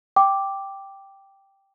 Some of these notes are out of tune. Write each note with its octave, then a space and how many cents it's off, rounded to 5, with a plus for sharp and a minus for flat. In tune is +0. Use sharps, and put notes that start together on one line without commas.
G5 +0 D6 +0